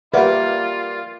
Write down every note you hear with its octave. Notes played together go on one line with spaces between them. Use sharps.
G3 A#3 F4 B4 D5 E5 F#5